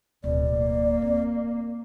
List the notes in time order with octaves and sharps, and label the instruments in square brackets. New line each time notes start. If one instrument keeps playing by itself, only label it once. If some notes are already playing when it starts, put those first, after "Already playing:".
[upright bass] D1 [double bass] B2 [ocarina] D5
[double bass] A#3
[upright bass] C4